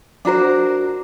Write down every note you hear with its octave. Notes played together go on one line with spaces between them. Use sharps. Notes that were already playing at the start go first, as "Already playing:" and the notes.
D4 F#4 A#4 C5